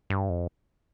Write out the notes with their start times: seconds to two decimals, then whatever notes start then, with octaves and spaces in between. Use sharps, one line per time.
0.10 G2
0.30 F2